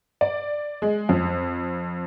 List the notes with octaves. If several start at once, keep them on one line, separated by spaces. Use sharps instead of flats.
D5
G#3
F2